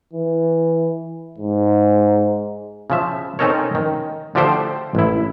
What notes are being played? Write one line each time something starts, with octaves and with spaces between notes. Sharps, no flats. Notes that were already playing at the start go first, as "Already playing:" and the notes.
E3
G#2
C#3 F3 E5
C4 C#4 D#4 A4 A#4 C#5
D#3
D3 F3 A3 G4 A4 C5
A1 E4